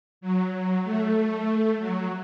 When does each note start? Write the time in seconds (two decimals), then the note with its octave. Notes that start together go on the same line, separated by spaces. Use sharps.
0.21 F#3
0.53 F#3
0.84 A3
1.78 F#3